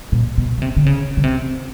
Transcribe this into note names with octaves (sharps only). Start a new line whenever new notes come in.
A#2
B2
C#3
C3
D3
C#3
C#3
C3